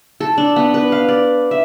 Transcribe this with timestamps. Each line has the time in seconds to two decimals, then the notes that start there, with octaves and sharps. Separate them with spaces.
0.20 A4
0.38 D4
0.56 B3
0.74 B4
0.92 F5
1.09 D5
1.51 E5